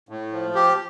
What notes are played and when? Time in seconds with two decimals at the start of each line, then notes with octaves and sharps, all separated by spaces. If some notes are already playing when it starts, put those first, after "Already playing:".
0.09 A2
0.32 F3
0.55 G4